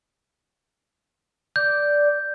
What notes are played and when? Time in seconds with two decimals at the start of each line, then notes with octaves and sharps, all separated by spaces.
1.56 D5 G6